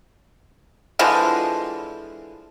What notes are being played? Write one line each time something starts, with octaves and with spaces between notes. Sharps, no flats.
D3 E3 F3 G#3